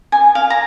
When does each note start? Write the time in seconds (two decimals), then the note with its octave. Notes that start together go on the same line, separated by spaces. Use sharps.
0.12 G#5
0.35 F5
0.50 A#5